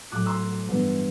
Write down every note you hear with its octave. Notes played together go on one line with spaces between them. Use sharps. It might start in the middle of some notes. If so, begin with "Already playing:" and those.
A2 F#3 A3 D6 F#6
C6 E6
G2 E3 B3